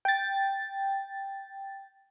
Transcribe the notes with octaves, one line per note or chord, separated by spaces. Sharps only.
G5 A6